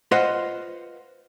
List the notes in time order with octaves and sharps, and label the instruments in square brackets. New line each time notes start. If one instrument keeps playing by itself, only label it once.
[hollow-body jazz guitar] F4 B4 C5 D#5 F#5